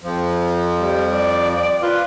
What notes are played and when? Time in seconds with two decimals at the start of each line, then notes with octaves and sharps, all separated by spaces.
0.03 F2 F3
0.81 G3
1.12 D5
1.82 F4 B4